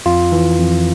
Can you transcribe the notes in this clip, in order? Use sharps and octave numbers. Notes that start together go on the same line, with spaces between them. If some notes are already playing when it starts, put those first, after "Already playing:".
F2 F4
E3
F2